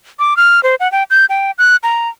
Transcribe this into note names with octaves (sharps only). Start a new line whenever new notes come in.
D6
F6
C5
F#5
G5
G6
G5
F#6
A#5